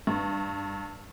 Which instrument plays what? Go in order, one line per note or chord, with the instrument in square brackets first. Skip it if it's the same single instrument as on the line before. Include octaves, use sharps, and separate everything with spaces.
[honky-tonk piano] G2